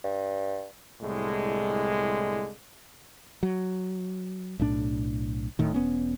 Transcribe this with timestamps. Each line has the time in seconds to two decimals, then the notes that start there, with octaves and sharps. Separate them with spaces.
0.04 G2
1.02 C2 A2 D3 G#3
3.43 F#3
4.59 B1 A2 D4
5.59 D1 A2 D#3
5.74 E1 B3 C#4